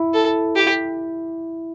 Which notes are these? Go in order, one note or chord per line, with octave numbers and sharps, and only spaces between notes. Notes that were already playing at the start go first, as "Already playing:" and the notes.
Already playing: E4
A4
G4